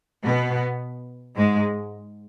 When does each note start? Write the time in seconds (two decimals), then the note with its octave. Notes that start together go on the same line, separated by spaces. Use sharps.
0.23 B2 B3
1.35 G#2 G#3